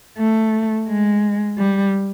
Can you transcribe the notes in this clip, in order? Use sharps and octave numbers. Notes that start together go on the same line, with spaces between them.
A3
G#3
G3